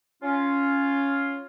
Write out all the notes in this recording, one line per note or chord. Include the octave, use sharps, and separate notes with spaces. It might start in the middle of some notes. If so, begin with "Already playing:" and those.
C#4 F4